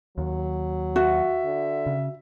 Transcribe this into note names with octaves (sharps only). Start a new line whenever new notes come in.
D#2 F#3
F#4 E5
D3
C#3